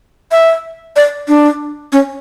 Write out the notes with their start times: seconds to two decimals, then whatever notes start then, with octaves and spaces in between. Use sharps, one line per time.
0.32 E5
0.96 D5
1.28 D4
1.92 C#4